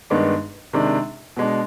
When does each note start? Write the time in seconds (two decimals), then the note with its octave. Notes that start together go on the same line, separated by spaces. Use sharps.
0.10 G2 D#3 G#3 B3 D4
0.73 C3 D#3 G#3 D4
1.37 B2 G#3 D4